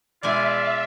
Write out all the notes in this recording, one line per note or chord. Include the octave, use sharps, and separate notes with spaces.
B2 G#3 F4 D5 E5 G#5